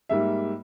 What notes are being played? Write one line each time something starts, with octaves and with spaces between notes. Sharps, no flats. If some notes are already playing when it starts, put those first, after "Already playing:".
G#2 G3 A#3 E5